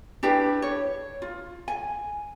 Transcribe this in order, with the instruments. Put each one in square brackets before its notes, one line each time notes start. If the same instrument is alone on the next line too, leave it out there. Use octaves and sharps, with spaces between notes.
[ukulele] D4 E4 G4 B4
C#5
F4
G#5